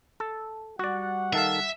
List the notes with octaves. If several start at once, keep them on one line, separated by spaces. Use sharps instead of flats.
A4
G3 F#4 D5 F#5
D#3 A4 E5 F5